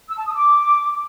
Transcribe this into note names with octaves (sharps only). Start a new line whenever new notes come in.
E6
A5
D#6
D6